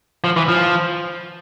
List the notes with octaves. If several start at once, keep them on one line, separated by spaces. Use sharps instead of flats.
F3
E3
F3